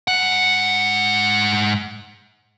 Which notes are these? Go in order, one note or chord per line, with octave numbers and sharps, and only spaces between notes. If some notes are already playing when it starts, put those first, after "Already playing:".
G#2 F#5